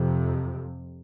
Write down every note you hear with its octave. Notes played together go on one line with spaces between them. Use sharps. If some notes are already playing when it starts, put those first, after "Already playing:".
Already playing: F2 C3